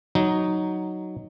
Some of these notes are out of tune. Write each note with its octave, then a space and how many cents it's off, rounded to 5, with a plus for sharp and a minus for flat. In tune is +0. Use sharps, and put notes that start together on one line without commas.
F#3 +5 D#4 +0